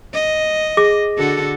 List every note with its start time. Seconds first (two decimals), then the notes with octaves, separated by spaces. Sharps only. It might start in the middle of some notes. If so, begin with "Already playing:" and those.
0.14 D#5
0.77 G#4 D6 A#6
1.17 D3 F#4 A4